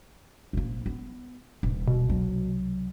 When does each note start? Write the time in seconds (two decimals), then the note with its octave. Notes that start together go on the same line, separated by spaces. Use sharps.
0.53 A#1 A#3
0.86 B3
1.63 D#1
1.88 B2
2.09 C2 F#3